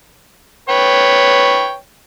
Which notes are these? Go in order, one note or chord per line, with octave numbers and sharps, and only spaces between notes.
B4 C#5 G5